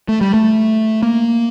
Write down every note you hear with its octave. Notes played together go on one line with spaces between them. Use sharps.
A3
G3
A3
A#3